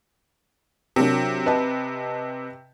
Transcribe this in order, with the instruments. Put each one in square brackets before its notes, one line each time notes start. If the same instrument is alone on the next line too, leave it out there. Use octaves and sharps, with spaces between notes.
[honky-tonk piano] C3 [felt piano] F#3 D4 A#4
[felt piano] B4 D#5 A5